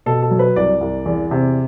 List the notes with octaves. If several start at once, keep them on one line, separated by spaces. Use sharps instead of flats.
B2 A4
A4
F#3
B4
C2 D5
C2
E2
C3